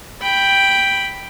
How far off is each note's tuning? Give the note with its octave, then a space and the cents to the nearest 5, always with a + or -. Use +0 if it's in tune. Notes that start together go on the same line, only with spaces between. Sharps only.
G5 +0 B5 +0